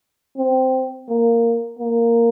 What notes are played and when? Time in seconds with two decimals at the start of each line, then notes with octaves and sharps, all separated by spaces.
0.37 C4
1.09 A#3
1.79 A#3